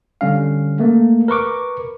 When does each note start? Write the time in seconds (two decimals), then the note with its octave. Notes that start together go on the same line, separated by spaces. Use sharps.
0.21 D3 G3 C#4 F5
0.79 A3 A#3
1.28 A#4 B4 C#6 D6